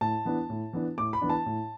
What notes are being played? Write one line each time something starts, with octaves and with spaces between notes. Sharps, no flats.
A2 A5
E3 B3 D4
A2
E3 B3 D4
A2 D6
B5
E3 B3 D4
A5
A2